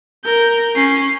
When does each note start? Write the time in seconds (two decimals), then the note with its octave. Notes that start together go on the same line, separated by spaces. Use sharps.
0.25 A#4 G6
0.75 C#4 C7